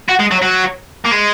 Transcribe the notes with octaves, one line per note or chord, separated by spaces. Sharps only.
F#4
G#3
F#3
F#3
A#3
G#3